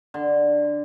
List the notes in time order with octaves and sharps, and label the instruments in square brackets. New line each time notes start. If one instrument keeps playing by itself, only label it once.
[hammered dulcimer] D3